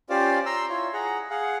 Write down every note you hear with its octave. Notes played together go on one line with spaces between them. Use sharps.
C#4 F4 G4 C5 D5 F5
A#5 C6 E6
E4 F4 C#5
G#4 F#5 A#5
G#4 F5 F#5